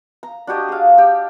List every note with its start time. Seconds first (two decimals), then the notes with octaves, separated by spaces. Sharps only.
0.23 A#5
0.47 D4 F#4 G4 D#5
0.69 G#4 F5
0.98 G4